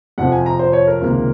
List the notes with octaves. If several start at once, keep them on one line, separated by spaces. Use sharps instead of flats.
F2 C3 F3 F#5
G#5
A#5
C5
C#5
A#4
C#2 C3 D#3 A#3